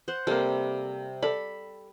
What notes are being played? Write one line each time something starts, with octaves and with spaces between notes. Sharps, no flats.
C5 F#5
C3 G3 A#3 A4
A4 D5 B5